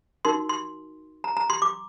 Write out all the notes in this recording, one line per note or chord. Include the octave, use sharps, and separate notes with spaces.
D#4 F#4 A#4 C6
C6
A#5
A#5
C6
D6